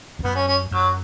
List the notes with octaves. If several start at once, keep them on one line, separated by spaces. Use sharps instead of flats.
E2
F#2 B3
C#4
C#4
F#2 F#3